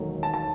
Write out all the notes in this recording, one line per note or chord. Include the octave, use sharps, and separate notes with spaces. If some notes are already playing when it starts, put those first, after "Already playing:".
Already playing: E1 D#2 D#3 F#3 A3
A5
A5